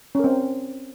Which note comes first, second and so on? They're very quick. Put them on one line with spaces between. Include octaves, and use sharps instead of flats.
C#4 A#4 C4